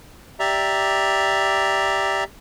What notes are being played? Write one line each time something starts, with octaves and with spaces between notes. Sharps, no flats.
G4 D5 E5 A#5